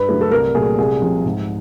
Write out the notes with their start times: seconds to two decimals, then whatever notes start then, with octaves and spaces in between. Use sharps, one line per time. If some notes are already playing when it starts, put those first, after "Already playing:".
Already playing: G2 B4
0.09 D3 F#3 A3
0.21 A4
0.31 C2 A#4
0.55 A#2 F#3 A3 G#4
0.78 C2 G#4
1.02 C3 F3
1.25 G#2